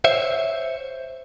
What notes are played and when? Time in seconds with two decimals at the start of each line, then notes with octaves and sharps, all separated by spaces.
0.04 C5 C#5 E5